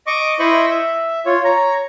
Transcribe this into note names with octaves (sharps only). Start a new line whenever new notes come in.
D#5 C#6 D6
E4 C5 D#5 B5 C#6
E5
F4 C#5
C#5 A#5